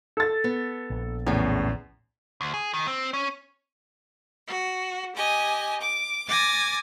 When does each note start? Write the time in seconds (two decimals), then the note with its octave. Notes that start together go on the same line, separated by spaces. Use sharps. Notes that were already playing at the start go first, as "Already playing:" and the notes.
0.17 A4 A6
0.44 B3
0.90 A#1
1.27 E2 A2 C#3 C#4
2.41 D2
2.54 G#4
2.74 D#3
2.88 C4
3.14 C#4
4.47 F#4
5.15 G4 D#5 G#5
5.81 D6
6.28 G#5 D6 A6 A#6